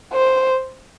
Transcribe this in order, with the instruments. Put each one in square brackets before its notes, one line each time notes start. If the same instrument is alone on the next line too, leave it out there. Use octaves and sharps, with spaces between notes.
[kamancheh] C5